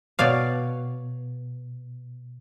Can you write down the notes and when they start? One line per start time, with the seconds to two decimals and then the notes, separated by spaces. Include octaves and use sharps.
0.19 B2 C#5 D5 F5